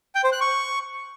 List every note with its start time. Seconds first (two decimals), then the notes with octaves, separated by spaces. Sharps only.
0.15 G5
0.24 C5
0.32 F#6
0.41 C#6